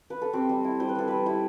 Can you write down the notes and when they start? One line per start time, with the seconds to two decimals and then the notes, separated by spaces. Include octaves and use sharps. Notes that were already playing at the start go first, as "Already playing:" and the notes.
0.10 B4
0.21 A4
0.33 C4 G4
0.49 G3
0.64 E4
0.80 G3 C5
0.89 B4
0.95 C4 A4
1.08 G3 B4
1.26 E4 G4